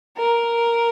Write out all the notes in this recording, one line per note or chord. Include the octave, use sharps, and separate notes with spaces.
A#4